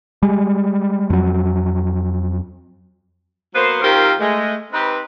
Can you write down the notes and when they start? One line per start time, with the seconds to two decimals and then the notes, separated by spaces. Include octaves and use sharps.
0.22 G3 G#3
1.10 F2 F#3
3.54 F#3 A#3 B3 B4 C5
3.82 D#3 C4 F4 G4 A#4 C5
4.19 G#3 A3
4.72 C4 D#4 G4 B4